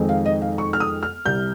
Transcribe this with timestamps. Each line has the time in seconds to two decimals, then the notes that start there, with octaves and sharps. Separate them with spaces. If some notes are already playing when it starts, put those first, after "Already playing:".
Already playing: F2 D#3 G#3 C4 D#4
0.09 F5
0.25 D#5
0.42 F5
0.58 C#6
0.73 F6
0.80 D#6
1.03 F6
1.25 C2 C3 G3 G6